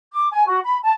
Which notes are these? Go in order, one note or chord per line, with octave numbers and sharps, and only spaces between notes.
D6
G#5
F#4
B5
A5